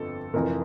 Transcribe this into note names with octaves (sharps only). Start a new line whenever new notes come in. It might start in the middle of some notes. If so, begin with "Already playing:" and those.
Already playing: G1 F2 A4
F1 F2 E3 A#4